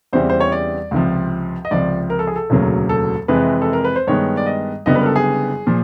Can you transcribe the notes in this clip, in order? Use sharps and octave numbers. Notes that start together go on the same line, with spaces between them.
E2 C#3 E3 G3 C4 C5
C5
C#5
D5
C#2 C3 F3
D#5
C#2 C3 F3 D5
A#4
A4
G#4
A4
E1 D2 C#3 F#3 A#3
A4
F2 C3 E3 G#3 B4
A4
A#4
B4
C5
G2 D#3 G#3 B3 C#5
D5
D#5
F#1 F#2 D3 G3 B3 D#5
B4
A#4
A4
G#4
A#2 F3